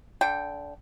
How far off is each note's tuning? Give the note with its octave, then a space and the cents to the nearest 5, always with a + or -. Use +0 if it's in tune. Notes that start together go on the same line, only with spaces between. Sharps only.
D3 -20 G5 +0